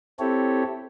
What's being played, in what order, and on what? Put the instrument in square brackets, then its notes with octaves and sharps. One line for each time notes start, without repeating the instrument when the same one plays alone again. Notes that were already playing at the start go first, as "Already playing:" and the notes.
[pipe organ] C4 E4 G4 A4 C#5